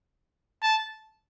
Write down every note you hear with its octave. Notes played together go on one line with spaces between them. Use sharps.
A5